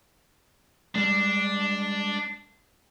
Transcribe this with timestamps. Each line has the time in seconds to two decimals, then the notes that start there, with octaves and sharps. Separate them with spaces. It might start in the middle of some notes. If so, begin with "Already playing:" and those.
0.95 G3 G#3 D4